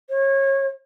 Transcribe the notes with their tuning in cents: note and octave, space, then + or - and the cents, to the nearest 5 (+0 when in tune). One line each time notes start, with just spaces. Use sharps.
C#5 -25